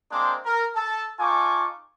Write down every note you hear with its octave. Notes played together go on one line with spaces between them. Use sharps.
G#3 A#3 C4 D4 C5 D6
A#4
A4 A5
D#4 F4 A4 G#5 C#6 D6